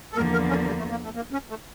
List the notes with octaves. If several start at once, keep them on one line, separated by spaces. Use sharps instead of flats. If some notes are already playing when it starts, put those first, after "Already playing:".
A4
E2 D3 F3 A#3 A#4
A#4
C#4
G3
A3
A#3
A3
A#3
C#4
A3